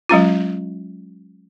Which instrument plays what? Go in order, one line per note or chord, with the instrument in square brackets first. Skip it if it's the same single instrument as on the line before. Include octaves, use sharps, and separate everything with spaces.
[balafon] F#3 G#3 C#4 F4